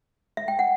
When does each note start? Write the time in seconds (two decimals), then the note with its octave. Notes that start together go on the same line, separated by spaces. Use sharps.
0.37 E5
0.48 G5
0.59 F#5